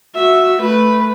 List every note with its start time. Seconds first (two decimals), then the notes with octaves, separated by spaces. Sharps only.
0.15 F#4 E5
0.61 A3 B4